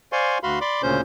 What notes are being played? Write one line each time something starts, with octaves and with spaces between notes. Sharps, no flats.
C5 D5 F5 G#5 C6 C#6
D2 F#4 F5 B5 C6
D5 B5 C6 D6
D2 A#2 C#3 C#4 C5 G6